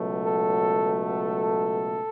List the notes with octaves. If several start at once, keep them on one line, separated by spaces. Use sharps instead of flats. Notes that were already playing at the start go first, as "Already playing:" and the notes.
Already playing: C#2 B2 F#3 A3
A4
A4